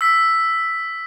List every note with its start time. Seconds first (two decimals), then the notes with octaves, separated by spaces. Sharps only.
0.01 E6 B6